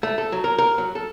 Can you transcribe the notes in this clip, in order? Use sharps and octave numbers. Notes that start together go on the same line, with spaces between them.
A3
A4
F#3
A#4
A#4
F#3
A4